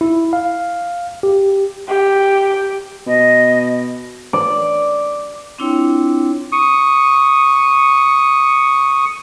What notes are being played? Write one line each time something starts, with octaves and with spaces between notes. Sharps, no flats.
E4
F5
G4
G4
B2 D#5
D5
C4 D4 E4 F4 C#5 G5
C#6 D#6